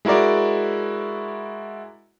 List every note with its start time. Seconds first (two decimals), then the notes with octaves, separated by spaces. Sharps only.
0.05 G#3 E4 F#4 A#4 D5